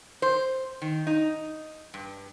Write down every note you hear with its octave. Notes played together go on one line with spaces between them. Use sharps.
C5
D#3
D#4
G2